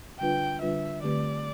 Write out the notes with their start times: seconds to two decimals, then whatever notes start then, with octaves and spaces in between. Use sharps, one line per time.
0.20 D3 G3 D4 F4 B4 G5
0.62 D3 G3 D4 F4 B4 E5
1.03 D3 A3 C4 G4 B4 D5